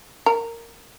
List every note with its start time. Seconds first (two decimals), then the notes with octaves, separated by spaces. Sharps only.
0.26 A#4